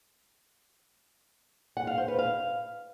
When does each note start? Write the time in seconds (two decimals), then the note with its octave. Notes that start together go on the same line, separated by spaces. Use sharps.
1.77 F#5
1.87 F5
1.98 C5
2.08 B4
2.19 F5